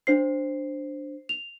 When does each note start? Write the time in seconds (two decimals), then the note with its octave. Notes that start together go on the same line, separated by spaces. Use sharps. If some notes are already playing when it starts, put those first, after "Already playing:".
0.07 D4 C5 C7
1.29 F7